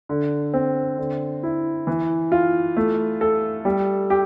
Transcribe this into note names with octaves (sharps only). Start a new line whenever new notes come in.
D3
C4
D3
E4
E3
F4
A3
A4
G3
G4